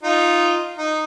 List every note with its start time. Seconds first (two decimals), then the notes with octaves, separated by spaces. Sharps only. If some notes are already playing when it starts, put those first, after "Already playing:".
0.03 D#4 F4
0.77 D#4